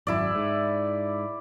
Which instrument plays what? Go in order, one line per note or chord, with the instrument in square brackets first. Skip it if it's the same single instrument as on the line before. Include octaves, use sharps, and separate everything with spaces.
[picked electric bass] G#1 F#2 [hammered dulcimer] E4 D5
[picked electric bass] G#2